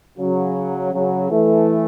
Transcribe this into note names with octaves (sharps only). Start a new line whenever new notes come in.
C#3 F#3
C#3 F#3
E3 A3